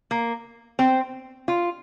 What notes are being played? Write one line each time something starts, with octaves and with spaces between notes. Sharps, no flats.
A#3
C4
F4